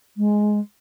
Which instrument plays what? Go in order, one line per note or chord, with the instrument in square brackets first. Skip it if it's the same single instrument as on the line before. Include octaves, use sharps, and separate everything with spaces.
[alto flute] G#3